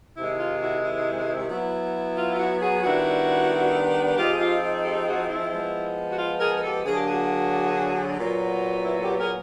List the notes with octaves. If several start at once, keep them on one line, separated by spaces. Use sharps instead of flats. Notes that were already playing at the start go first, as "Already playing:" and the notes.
C3 D#3 G#3 E4
F4
E4 F#4
E4
F#3 B3 E4
F4
F4
E4 F#4
F#4 G#4
D#3 G3 B3 D4 E4 F#4
F3 G#3 C4 D#4 F4 G4
G#4
F4 G4
G4 A4
F#4 G#4
E4
F3 G#3 B3
F#4
F4
G#4 A#4
A#4
G4 A4
D3 F#3 A#3 D4 G#4
G4
F#4 G#4
A#2 F#3 B3
E4
G4 A4
G#4 A#4